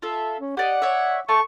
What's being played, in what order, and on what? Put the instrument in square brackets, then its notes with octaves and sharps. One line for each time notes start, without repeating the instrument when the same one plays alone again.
[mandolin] F4 A4 E5
[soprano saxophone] C#4
[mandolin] G4 D5 D#5 [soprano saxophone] F#5
[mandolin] C#5 D5 E5
[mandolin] A3 A5 C6 [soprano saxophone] C#6